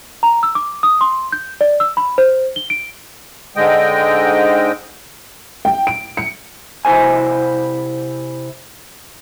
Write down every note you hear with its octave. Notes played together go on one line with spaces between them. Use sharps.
A#5
E6
D6
D#6
C6
G6
D5
E6
B5
C5
G7
D7
G#2 D3 G#3 D#5 G5
G5
D7
C#7
C3 E4 A#4 C5 G#5